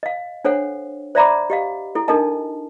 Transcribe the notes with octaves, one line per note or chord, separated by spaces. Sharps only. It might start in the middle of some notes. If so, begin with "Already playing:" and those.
D#5 F5
D4 A4 C5 C#5 F#5
C5 D5 E5 A#5 B5 D6
G4 D#5 F5
E4 A4
D4 D#4 A4 A#4 D#5 A5